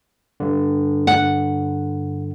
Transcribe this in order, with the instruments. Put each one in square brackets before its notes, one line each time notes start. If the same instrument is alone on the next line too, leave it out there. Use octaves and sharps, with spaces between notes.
[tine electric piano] G2 D3
[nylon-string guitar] F#5